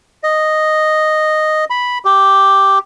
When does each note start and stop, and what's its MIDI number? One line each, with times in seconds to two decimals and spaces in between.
0.23 1.65 75
1.70 1.98 83
2.05 2.79 67